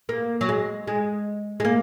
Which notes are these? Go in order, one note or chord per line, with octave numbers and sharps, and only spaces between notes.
A#3
F#3
G#3
G#3
G#3
A#3